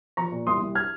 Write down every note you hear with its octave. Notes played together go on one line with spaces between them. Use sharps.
F3 A#5 C#6
A#2
C2 C6 D#6
C2
F6 G#6